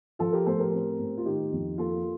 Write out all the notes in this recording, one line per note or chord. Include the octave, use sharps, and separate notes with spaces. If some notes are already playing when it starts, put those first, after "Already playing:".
F3 F4 A4
G4 A#4
A2 A4 C5
G4 A#4
C4
A2
F4
D#3 D#4 G4
F2
A#3 F4 A4